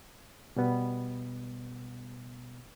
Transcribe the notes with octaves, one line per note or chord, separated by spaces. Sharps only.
B2 G3 B3